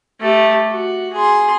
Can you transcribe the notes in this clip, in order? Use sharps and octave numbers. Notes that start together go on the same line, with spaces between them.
A3 G4
F#4
G#4 C6